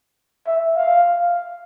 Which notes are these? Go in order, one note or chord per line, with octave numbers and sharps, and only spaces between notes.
E5
F5